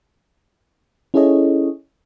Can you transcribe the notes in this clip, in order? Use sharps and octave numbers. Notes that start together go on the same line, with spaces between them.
C#4 E4 G#4 A4 C#5 D#5